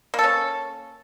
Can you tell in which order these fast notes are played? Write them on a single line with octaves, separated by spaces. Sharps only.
A#3 A4 C#4